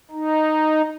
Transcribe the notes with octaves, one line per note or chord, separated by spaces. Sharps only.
D#4